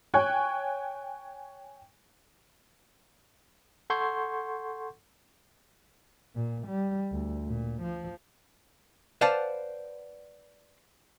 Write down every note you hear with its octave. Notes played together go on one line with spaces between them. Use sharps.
C#5 G5 G#5 C#6 F#6 G#6
A4 F#5 C6 C#6 G6 G#6
A#2
G3
D2
A#2
F3
B4 C5 D5 F5 F#5 A5